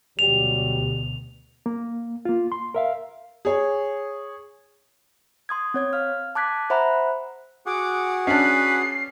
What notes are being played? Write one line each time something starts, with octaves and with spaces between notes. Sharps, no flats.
D2 B2 F#3 G3 G4 F7
A#3
A#3 F4
C6
A#4 E5 F5
G#4 C#5
C6 D#6 G#6
C4 C#5 G#6
F5 F6
A5 D6 F#6 G#6 B6
C5 E5 F#5 A#5 B5 F#6
F#4 G#4 F#5 D6
C#4 D4 B4 C7